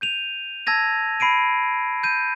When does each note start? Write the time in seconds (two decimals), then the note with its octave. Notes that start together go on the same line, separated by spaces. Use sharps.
0.01 G6 D#7 F7
0.66 A5 E6 G#6 A#6 D#7
1.20 B5 C7 D7 D#7
2.03 G6 D#7